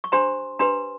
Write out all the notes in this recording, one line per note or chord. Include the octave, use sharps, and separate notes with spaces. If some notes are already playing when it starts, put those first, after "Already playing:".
C#6
D4 G4 C5 A#5 C6
D4 G4 B4 A#5 C6